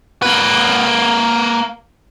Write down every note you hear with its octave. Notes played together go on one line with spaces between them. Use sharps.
A#3 B4